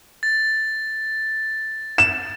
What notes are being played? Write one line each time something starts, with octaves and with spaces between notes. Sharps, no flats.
A6
E7